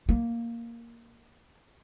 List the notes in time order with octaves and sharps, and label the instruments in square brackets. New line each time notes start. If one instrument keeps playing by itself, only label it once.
[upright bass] A#3